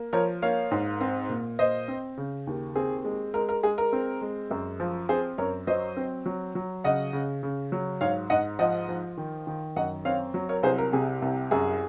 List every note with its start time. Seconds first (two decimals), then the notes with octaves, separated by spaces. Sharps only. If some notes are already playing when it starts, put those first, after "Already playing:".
Already playing: A#3
0.13 F3 A#4 C#5
0.42 A#3 C#5 F5
0.71 G#2
1.01 C4
1.29 A#2
1.59 A#2 C5 D#5
1.88 C4
2.17 C#3
2.47 D#2
2.76 C4 G#4
3.04 G#3
3.34 G#3 A#4
3.49 A#4
3.63 G#3 G#4
3.78 A#4
3.93 C4
4.22 G#3
4.51 F#2
4.80 F3
5.09 C4 G#4 C5
5.38 F#2 A#4 C#5
5.67 F#3 C5 D#5
5.97 C4
6.26 F#3
6.55 F#3
6.84 C#3 D#5 F#5
7.13 C#3
7.43 C#3
7.72 F#3
8.01 G#2 C#5 F5
8.30 G#2 D#5 F#5
8.59 F3 D#5 F#5
8.89 F3
9.17 D#3
9.47 D#3
9.76 F#2 D#5 F#5
10.05 C4 C#5 F5
10.34 F#3
10.49 A#4 C#5
10.63 C2 G#4 C5
10.78 A#4
10.93 C3 G#4
11.22 C2
11.51 F#2 G#4